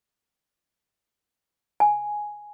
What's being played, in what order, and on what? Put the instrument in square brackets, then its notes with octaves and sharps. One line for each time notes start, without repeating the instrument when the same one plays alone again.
[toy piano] G#5